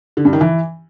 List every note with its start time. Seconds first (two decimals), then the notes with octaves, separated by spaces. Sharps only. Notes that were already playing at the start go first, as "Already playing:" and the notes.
0.17 D3
0.25 G2
0.33 D#3
0.41 E3